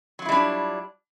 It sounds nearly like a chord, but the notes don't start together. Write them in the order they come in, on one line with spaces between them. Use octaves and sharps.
F#3 F4 E4 G3 D4